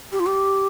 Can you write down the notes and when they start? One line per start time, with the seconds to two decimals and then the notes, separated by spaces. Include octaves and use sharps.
0.12 G4
0.20 F4
0.26 G4